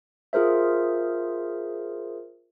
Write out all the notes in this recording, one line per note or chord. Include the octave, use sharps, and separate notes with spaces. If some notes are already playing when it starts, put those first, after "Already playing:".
F4 G#4 A#4 C5 E5